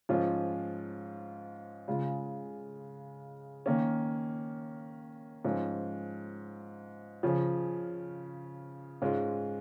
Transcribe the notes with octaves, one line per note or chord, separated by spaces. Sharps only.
G#2 F3 C#4 F4
C#3 G#3 F4
D#3 A#3 C#4
G#2 F3 C#4 F4
C#3 F3 C#4
G#2 G#3 C#4 F4